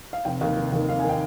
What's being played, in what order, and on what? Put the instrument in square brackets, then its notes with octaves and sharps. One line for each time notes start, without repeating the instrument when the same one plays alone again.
[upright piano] F5
F1 G5
D#2 D#3 F5
F1
D#2 D#3
F1 F5
G#5
D#3
G5